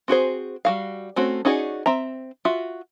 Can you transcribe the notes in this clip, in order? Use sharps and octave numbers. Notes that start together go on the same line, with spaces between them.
C4 F#4 G#4 C5
G3 F#4 F5
A3 C4 C#4 F#4
C#4 D#4 F#4 G#4 D5
C4 E5 A#5
F4 F#4 E5